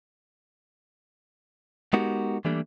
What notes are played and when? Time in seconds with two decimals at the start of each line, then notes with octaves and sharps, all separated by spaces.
1.93 G#3 B3 D#4 F#4 G4 A#4
2.45 E3 G3 A3 A#3 D4